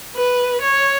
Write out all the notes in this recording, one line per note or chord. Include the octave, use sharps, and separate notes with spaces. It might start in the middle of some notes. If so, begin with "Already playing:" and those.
B4
C#5